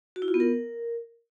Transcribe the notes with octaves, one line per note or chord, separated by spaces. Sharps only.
F#4
E4
F4
B3
A#4